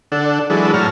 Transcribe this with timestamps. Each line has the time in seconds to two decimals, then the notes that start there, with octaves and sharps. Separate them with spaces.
0.12 D3 D4 A4 F#5
0.50 E3 F#3 G#3 D4 A4 B4
0.74 A2 F#3 C#5 A5 A#5 F6